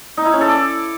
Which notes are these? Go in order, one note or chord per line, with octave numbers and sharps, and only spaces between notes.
D#4
E4
C#4
A4
D5